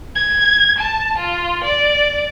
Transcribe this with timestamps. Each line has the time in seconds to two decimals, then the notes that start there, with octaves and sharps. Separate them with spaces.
0.15 G#6
0.78 A5
1.18 F4
1.64 D5